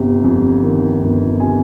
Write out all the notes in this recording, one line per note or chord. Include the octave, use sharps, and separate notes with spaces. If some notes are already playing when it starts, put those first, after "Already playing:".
Already playing: G1 C3
F2
D#3
G1
C3 G#5